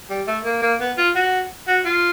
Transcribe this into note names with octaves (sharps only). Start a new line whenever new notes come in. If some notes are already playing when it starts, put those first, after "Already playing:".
G3
A3
A#3
A#3
B3
F4
F#4
F#4
F4